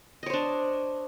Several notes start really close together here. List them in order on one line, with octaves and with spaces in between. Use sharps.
D#5 C#5 C5 D4